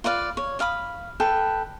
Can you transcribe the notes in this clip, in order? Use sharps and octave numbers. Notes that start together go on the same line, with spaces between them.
F4 B4 D5 F5
C#5
D5 F5 B5 D#6
A4 B4 G5